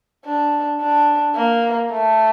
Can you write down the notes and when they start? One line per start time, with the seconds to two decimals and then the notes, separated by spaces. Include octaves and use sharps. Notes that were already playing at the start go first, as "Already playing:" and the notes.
0.25 D4
0.80 D4
1.35 A#3
1.91 A3